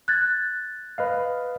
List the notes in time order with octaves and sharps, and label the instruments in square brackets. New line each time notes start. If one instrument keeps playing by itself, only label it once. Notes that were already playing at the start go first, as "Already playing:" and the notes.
[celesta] F#6 G#6 A6
[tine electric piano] B4 D#5 F5